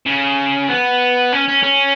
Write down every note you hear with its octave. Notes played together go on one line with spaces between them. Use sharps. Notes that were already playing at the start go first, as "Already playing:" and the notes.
C#3
B3
C#4
C#4
C#4